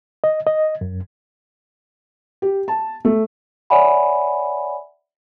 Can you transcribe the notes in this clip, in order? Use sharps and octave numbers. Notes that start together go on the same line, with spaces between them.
D#5
D#5
F#2
G4
A5
A3
C#5 D5 E5 F#5 G#5 B5